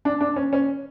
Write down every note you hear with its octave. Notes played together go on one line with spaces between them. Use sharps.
D4
D4
C#4
C#4